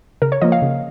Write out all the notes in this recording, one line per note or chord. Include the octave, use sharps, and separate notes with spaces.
C#3 A#4
C#5
F3 A#3 D#5
F5
C#3